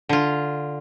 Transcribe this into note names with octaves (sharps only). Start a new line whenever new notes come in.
D3 F4